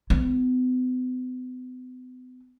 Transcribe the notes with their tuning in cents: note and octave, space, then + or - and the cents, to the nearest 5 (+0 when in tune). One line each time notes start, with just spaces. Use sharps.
B3 +45 E4 -10